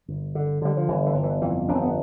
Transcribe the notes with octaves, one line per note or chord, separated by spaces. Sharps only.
G1
D3
D3 G3
F3
G1 E3
E3
G1
E3
F2 E3
G1 D4
C4
B3